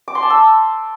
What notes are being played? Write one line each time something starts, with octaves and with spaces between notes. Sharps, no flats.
D6
C6
A5
E6